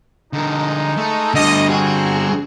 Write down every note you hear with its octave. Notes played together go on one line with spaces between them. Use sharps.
D3 G#3 D#4 A#4
A3
D3 G3 A3 D4 D#5
C4 F#4 G#4